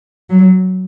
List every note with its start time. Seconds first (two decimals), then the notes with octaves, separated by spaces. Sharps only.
0.30 F#3